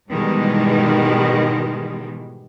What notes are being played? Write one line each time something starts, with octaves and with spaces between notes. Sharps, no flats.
G#2 B2 D#3 E3 G3 G#3